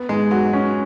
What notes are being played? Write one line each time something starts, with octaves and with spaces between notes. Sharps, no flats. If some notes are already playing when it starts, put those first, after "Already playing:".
Already playing: B3
G#2 G#3
F#3 F#4
C#4